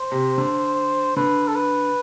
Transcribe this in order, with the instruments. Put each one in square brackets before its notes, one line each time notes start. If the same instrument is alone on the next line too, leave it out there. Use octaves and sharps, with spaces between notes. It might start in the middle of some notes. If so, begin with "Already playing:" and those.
Already playing: [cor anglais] C5
[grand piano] C3
D3
[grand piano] D3 [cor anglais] B4
[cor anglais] A4
B4